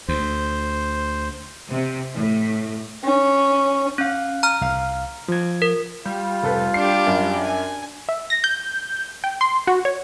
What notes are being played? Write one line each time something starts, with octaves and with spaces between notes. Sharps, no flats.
D2 C5
C3
A2
C#4
C#4 F5 F#6
A#5 F6
C2 F5
F3 G#6
A#4
G3 F4
F1 A4 B4
D4 G4 C7
F#2
G#5
E5
A#6
G6
G5
C6
F#4
C#5